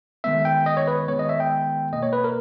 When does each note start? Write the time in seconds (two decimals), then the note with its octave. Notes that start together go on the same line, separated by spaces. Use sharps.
0.24 D#3 G#3 B3 E5
0.45 G5
0.66 D#5
0.77 C#5
0.87 B4
1.08 D#3 G#3 B3 C#5
1.19 D#5
1.29 E5
1.40 G5
1.92 B2 A#3 D#5
2.02 C#5
2.13 B4
2.24 A#4